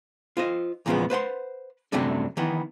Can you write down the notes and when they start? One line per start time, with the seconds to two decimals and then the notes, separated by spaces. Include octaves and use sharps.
0.37 F4 C5 D#5
0.86 E2 A#2 C#3 F3 G#3 B3
1.10 B4 C5 F#5 C6
1.92 F#2 C3 F#3 G3 A3 D4
2.37 D#3 E3 B3